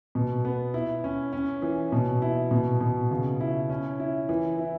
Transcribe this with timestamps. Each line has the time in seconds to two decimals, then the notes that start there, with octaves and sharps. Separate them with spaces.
0.15 B2
0.45 B3
0.74 E4
1.04 C#4
1.33 C#4
1.62 E3
1.92 B2
2.22 E4
2.51 B2
2.81 B2
3.11 C#3
3.41 E4
3.70 C#4
4.00 E4
4.29 E3
4.59 E4